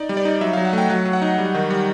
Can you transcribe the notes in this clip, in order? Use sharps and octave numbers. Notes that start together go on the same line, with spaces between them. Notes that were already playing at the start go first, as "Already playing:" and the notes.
Already playing: D#4 D5
G3
D5
D#4
F#3 E5
F#3 F5
F#5
A3 G5
F#3 F#5
F#3
F#5
D#4
G3
D#3
G3